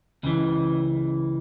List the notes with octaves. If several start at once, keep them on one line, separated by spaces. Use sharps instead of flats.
C#2 C#3 E3